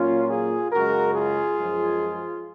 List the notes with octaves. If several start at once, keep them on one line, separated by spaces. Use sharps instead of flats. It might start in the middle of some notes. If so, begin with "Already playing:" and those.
Already playing: A#2 F#3 A#3 C#4 F4
F4 G#4
F#2 C#3 G#3 F#4 A#4
F4 G#4
F#2 F3 G#3